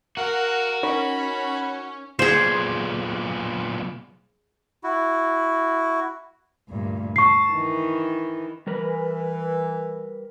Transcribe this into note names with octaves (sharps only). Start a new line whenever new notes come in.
F#4 A#4 F5 F#5
C#4 D#4 A#4 C#5 B5
B1 A#2 G#4 C5
E4 F#4
D2 G2 A#2
A5 C#6 C7
D#3 E3
E3 G3 A#4 B4